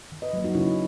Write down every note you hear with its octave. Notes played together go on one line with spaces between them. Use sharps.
D#3
B4 D#5
F#3 A#3
D#4 F#4
C#3 C#4 E4